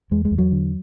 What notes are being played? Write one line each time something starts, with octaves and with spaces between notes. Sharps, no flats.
E2 G#3
G#3
E2
F#3
D3